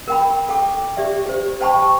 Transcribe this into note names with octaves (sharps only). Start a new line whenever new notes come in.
A#4 G5 B5
A4 G5 D6
G4 D5 E5
G4 C5
C5 G5 A5 B5 C#6